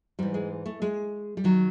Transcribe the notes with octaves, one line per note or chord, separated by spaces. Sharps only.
G#2 E3 G3
G#3
A3
G#3
G3
D#3 F#3